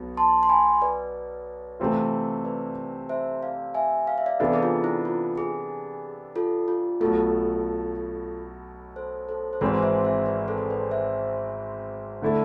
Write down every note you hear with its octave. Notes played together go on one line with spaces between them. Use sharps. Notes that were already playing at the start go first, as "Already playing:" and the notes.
Already playing: B1 B2 B3
A5 C6
C6
G#5 B5
B4 D5
C3 E3 A3 C4 F4
B4 D5
C5 E5
D5 F5
E5 G#5
F5
E5
D5 F5
C3 E3 B3 D4 A4 B4 D5
G#4
F4
E4
F4
G#4
F4 A4
F4
B1 B2 A3 F4 A4
A4 C5
A4 C5
C5
G#1 G#2 E3 G#3 C4 B4 D5
C5 E5
C5 E5
B4 D5
A4 C5
B4 D5
C5 E5
D3 A3 E4 A4